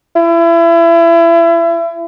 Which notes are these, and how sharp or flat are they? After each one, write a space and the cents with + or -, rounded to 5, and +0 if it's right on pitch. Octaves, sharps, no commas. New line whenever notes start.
E4 +30